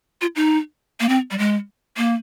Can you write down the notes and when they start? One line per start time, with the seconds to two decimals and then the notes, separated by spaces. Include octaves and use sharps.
0.21 F4
0.36 D#4
1.00 A#3
1.09 C4
1.31 G3
1.38 G#3
1.97 A#3